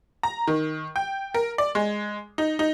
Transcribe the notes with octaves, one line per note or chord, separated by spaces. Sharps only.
A#5
D#3
G5
A#4
D5
G#3
D#4
D#4